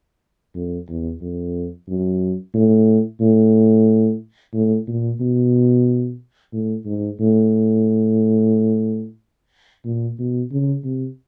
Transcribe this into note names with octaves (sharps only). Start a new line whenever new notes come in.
F2
E2
F2
F#2
A2
A2
A2
A#2
B2
A2
G#2
A2
A#2
B2
C#3
C3